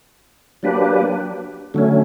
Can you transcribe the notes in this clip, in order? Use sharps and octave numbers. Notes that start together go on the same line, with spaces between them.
F#3 A#3 D4 G4 B4
D3 F#3 A3 C#4